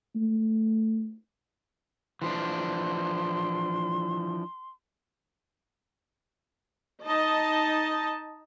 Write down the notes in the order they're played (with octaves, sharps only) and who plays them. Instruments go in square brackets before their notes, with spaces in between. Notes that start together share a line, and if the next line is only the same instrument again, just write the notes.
[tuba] A3
[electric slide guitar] E3 F3 D4 [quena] C6
[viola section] D#4 D#5 A5